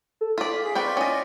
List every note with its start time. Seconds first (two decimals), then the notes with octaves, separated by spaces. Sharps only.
0.21 A4
0.38 F4 D5 B6
0.63 G#4
0.75 C4 F4 B4 D5 G5 C#6
0.97 C#4 D#5